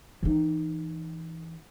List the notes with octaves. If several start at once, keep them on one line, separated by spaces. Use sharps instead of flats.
E3 D#4